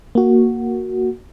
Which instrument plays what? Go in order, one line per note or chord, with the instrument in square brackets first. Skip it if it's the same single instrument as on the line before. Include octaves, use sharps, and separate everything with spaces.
[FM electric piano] A#3 F#4